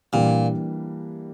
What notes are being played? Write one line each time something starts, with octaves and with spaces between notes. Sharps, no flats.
A#2 E3 G3 A#3 D4 G4